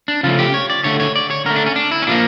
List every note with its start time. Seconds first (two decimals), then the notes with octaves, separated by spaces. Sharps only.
0.08 D4
0.23 C#3 F3 A3 F4
0.39 G4
0.54 C#5
0.70 D5
0.84 D3 A3 C#5
1.00 C#5
1.16 D5
1.30 C#5
1.46 D3 A#4
1.50 A3
1.56 D4
1.66 C#4
1.76 D4
1.91 E4
2.02 C#4
2.07 A#2 F3 A#3 D4